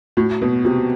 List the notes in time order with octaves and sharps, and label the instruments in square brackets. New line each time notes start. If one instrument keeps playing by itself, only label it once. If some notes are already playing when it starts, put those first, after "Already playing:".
[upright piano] A2 [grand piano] F#4
[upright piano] B2 [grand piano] B3
[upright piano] C3 [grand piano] F#4